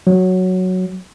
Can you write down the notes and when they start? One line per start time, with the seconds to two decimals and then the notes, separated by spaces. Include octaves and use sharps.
0.07 F#3